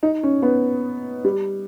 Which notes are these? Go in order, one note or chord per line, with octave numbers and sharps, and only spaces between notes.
D#4
C#4
B3
G3